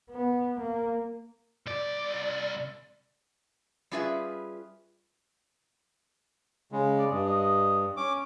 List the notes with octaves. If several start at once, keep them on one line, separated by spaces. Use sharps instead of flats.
B3
A#3
C2 D5
G3 C#4 F4 G#4 B4 E5
C#3 G#3
D5
G2 D#5
D#5
C#4 D6